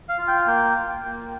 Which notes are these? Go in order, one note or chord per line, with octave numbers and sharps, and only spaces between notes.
F5
F4
G5
A#3 G5
F4
A#3